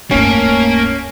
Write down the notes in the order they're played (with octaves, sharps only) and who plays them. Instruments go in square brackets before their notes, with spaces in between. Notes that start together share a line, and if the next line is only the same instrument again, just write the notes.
[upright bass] D1 G2 [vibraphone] A3 C#5 G#5 [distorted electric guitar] A#3 [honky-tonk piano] C#4